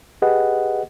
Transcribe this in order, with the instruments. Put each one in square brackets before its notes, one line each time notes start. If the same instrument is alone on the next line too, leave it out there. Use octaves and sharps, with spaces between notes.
[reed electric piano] G4 G#4 B4 D#5 F#5